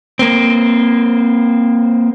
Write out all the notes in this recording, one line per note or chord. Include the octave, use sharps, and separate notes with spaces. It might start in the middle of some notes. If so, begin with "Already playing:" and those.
A#3 C4